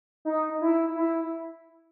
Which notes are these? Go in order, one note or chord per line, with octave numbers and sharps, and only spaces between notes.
D#4
E4
E4